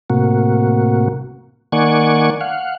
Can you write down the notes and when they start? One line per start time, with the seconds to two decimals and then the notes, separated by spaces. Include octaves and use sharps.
0.10 A2 C3 A#3 F#4
1.72 D#3 A#3 D5 F#5 G#5 C#6
2.41 F5 F#5